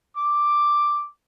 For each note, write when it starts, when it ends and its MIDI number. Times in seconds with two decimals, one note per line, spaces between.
0.17 1.07 86